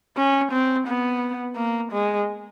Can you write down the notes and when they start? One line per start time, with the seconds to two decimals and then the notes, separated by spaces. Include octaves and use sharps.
0.17 C#4
0.52 C4
0.87 B3
1.56 A#3
1.92 G#3